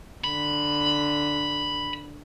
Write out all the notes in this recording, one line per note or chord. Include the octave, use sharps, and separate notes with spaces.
D3 B5